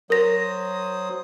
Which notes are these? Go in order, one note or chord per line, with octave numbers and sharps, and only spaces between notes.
F#3 A#4 C5 D#6 A#6